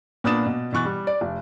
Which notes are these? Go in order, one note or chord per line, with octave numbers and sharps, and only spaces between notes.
A#2 B3 D4 D#6 A6 E7
B2
B2 E3 C#6 F#6 A6
G3
D5
F1